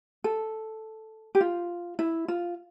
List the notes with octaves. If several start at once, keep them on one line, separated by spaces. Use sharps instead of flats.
A4
G4
F4
E4
F4